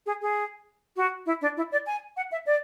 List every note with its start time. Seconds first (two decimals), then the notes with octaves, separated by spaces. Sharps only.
0.06 G#4
0.21 G#4
0.96 F#4
1.26 E4
1.41 D4
1.57 E4
1.72 D5
1.86 G#5
2.16 F#5
2.32 E5
2.46 D5